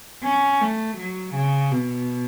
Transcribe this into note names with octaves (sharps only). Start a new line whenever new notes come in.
C#4
A3
F#3
C#3
B2